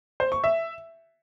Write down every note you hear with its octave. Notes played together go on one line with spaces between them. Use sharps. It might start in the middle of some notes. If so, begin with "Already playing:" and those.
C5
C#6
E5